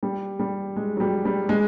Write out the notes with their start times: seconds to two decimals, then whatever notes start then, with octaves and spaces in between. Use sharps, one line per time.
0.03 G3
0.39 G3
0.76 G#3
0.97 F#3
1.00 G3
1.25 G3
1.49 G#3